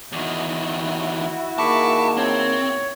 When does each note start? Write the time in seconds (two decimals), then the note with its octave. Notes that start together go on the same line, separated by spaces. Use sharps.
0.12 E2 D#3 E4 F#4
1.58 D#3 A#3 G#4 A5 B5 C#6 D6
2.17 C4 C#5